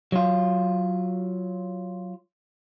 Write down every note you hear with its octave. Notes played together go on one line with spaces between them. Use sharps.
F#3 F4